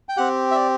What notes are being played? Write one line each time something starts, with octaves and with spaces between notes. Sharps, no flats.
G5
C4 G4 F#5
E5
D5